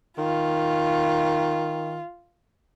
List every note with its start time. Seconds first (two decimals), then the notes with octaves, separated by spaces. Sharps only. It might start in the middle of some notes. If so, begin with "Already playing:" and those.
0.18 D#3 F4